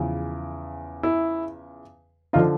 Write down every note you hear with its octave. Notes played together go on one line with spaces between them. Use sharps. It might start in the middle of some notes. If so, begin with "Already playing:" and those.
Already playing: E2 C#3 F3
E4
D3 F3 D#4 F4